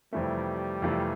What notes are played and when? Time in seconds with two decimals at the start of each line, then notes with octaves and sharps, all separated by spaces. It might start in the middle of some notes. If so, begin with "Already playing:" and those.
0.13 F2 C3 E3 G3 A3
0.82 F2 C3 E3 A3